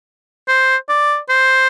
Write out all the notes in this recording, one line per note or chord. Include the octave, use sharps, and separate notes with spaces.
C5
D5
C5